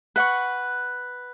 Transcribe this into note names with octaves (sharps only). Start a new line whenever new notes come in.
B4 F#5 C#6